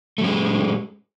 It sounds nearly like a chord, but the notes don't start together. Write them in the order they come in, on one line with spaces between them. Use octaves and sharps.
A3 F#3 C#4 G#3